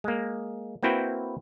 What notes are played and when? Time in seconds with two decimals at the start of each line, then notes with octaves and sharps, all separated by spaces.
0.04 G#3 A#3
0.83 A#3 C4 E4 F#4 B4 G5